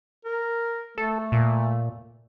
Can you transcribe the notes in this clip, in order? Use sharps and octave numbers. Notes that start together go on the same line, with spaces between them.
A#4
A3 A4
A#2